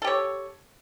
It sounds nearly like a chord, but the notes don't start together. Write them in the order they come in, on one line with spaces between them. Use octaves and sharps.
A4 G4 C#5